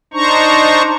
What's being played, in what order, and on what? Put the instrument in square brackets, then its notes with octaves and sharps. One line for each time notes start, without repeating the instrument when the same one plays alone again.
[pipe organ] D4 D#4 C5 A#5 C#6